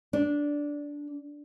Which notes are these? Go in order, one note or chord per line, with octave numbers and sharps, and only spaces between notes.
D4